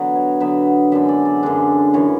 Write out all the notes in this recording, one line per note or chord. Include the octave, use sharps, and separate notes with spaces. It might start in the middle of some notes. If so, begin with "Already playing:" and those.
Already playing: D3 F#3 B3 F#4
C#5
D3 F#3 B3 E5
F#2 D3 G#3 D4 E5
D5
D5
F#2 D3 G#3 D4
F#2 C#3 E3 C#5